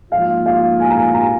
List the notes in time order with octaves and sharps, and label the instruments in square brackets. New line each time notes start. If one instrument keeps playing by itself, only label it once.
[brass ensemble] G#2 F3 A#3 F4 [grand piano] F5
[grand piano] F5
G#5
A#5
G#5
A#5